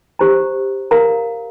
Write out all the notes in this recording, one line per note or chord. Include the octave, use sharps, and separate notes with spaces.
G4 C5 A#5
A#4 F5 A#5